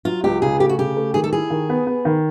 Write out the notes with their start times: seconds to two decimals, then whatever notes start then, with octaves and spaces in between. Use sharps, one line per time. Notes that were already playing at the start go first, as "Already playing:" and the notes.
0.05 F#3 F4
0.24 C#2 G4
0.42 C#3 G#4
0.60 A3 G4
0.69 F#4
0.78 C#3 G4
0.96 A3
1.14 D#3 G#4
1.24 A4
1.33 E4 G#4
1.50 D#3
1.70 B3
1.87 B3
2.05 D#3